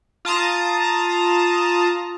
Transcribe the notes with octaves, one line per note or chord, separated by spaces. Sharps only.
F4 A5 A#5 D#6